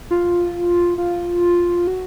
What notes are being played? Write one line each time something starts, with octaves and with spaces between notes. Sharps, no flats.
F4
F4
F#4